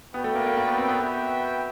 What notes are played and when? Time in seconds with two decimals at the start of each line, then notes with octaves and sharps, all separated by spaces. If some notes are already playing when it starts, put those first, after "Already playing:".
0.14 B3 F#4 B4 D5 G5
0.24 A3
0.35 A#3
0.46 A#3
0.57 A#3
0.68 B3
0.78 C4
0.88 B3
0.98 B3 F#4 B4 E5 G5